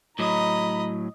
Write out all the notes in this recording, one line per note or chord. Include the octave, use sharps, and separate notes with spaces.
A2 F#3 D#5 A#5 B5